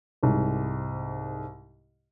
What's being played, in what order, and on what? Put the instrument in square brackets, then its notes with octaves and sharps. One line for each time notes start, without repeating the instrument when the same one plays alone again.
[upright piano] C2 G#2